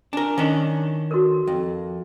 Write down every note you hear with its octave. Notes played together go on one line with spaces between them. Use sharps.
D4 A#4 G#5
D#3 C#4 D4
F#4 A4 A#4
F2